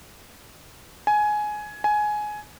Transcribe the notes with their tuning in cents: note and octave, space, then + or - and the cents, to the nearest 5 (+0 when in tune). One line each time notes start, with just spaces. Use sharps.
G#5 +15
G#5 +15